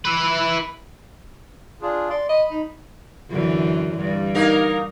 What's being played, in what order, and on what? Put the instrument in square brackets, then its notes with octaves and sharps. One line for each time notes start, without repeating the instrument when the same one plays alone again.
[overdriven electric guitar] E4 B4
[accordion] D4 F4 G#4
[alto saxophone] D5 [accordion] C6
[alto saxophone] D#5 [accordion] B5
[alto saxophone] D#4
[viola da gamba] F#2 D3 E3
G2
[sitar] A#3 D#4 A#4